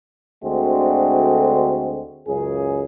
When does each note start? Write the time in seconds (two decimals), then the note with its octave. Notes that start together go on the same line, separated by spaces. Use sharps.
0.44 D2 D3 G#3 C4 F#4
2.28 C#2 F#2 C#3 G#4